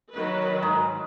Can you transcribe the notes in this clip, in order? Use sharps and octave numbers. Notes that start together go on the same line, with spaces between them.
D#3 F#3 B4
G#2